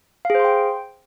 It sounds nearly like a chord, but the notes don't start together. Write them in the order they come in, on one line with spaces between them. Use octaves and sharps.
F5 G#4 C5 C6 G5